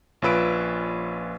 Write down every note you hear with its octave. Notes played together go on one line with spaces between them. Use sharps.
A#1 C#4 F4 B4 E6 D7